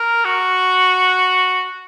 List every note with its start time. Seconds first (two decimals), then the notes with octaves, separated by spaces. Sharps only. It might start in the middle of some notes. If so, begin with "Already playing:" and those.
Already playing: A#4
0.25 F#4